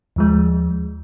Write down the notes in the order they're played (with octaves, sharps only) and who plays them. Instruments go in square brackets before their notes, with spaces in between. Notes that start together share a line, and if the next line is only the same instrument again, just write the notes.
[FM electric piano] D#2 F3 G#3